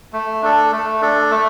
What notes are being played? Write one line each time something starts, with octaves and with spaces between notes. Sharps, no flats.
A3
D4 A4
A3
D4 A4
A3